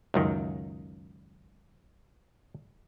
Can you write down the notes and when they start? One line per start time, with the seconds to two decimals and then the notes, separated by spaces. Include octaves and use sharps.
0.14 C#2 F#2 D#3